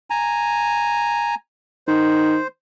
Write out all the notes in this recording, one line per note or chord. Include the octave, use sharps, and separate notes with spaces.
G#5 A#5
D#3 C5